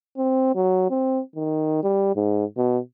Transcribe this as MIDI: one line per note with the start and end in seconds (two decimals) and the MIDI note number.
0.17 0.55 60
0.55 0.88 54
0.90 1.20 60
1.36 1.78 51
1.83 2.16 55
2.16 2.45 44
2.57 2.79 47